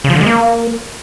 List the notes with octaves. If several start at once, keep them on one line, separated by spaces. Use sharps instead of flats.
C#3
F3
D3
G#3
A#3